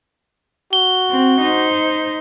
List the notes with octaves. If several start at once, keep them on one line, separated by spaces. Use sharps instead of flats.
F#4 G7
C4
D#4 C5